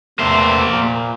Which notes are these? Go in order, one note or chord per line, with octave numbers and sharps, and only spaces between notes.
E2 C3 A3 A#3 C5
A#2